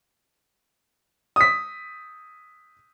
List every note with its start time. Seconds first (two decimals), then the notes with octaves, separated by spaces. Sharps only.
1.36 D#6 B6